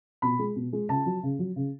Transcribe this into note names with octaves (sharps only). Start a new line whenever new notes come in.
B2 B5
G#3
B2
G#3
C#3 A5
F#3
C#3
F#3
C#3